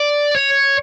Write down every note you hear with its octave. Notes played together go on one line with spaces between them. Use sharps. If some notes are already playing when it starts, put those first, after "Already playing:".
Already playing: D5
C#5